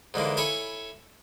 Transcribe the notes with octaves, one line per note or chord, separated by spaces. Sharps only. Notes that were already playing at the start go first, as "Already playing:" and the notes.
G#2 D3 E3 A#3
E4 A4 C#5 G#5 B5 C#6